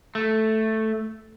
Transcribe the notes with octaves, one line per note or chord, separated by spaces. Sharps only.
A3